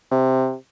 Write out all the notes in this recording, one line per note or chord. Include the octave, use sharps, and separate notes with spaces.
C3